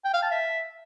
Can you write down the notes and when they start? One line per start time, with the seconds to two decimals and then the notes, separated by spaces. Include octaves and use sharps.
0.05 G5
0.14 F5
0.22 A5
0.31 E5